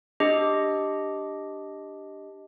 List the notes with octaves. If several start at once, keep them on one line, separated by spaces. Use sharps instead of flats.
D4 G4 D#5